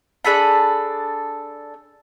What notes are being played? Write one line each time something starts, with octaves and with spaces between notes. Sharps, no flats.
D4 G#4 A4 B5